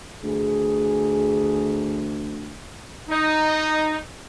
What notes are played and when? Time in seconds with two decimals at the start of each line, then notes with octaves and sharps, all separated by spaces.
0.24 D2 G#4
3.09 D#4